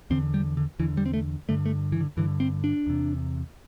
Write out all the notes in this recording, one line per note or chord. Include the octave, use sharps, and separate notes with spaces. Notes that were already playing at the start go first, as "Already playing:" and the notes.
E2 D3 C4
G3
D3
E2 D3 E3
G3
C4
A3
G2 D3 A3
A3
E3
D3
G2 D3 E3
C4
D4
E2 C3